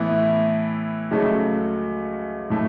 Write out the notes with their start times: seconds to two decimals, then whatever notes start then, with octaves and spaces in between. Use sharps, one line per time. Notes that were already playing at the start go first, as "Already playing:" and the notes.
Already playing: A2 E3 B3 E4
1.11 C#2 C#3 F#3 A3
2.50 A2 F#3 A3 C#4